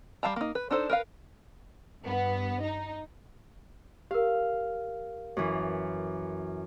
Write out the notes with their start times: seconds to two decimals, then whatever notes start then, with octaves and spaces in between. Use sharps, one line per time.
0.23 G3 F5 A5 A#5
0.36 A#3 D#4
0.55 B4
0.71 D4 D#4 A4 C5
0.90 A#4 B4 F5
2.02 G2 B3
2.61 D#4
4.11 G4 A#4 F5
5.37 F#2 E3